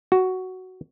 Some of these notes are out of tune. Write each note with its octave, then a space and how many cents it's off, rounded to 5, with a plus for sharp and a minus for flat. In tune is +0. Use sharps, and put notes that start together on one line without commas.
F#4 +5